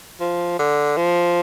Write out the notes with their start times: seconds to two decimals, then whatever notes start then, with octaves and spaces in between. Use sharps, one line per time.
0.20 F3
0.59 D3
0.97 F3